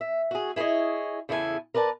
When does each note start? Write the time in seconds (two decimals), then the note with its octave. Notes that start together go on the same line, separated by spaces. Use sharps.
0.01 E5
0.31 F#4 G#4
0.56 E4 G#4 B4 C#5 D#5
1.29 E2 C#3 E4 A4 A#4 G#5
1.74 A#4 B4 D5 G#5 A5